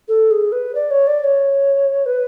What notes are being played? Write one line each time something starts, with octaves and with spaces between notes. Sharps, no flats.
A4
G#4
B4
D5
C#5
D5
C#5
B4